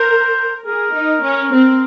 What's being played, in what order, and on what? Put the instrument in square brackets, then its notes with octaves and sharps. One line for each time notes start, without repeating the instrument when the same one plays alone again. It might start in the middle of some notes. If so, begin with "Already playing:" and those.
Already playing: [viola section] A#4 [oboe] C5
[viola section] G#4 [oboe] A#4
[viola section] D#4
C#4
C4